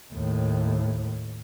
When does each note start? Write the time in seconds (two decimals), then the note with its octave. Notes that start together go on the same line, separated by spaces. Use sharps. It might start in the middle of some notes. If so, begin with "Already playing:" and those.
0.13 D#2 A2